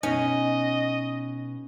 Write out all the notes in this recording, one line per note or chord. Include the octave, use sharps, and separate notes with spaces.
B2 C#4 D#4 D#5